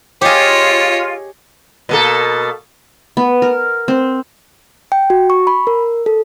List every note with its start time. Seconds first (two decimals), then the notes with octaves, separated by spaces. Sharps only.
0.21 F4 G4 G#4 C#5 D#5
1.89 B2 A#3 A4
3.17 B3
3.42 A#4
3.88 C4
4.92 G5
5.10 F#4
5.30 C#6
5.47 B5
5.67 A#4
6.06 A4